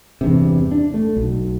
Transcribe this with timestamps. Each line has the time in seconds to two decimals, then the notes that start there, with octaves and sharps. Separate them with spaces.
0.21 E2 G2 C3
0.72 D4
0.94 A3
1.17 B1